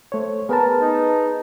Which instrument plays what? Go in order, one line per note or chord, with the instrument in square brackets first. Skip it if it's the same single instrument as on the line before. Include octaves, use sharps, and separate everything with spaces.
[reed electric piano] A3 C5 C#5
[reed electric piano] B3 [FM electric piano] G#4 B4 A5 [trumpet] A#4
[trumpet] D#4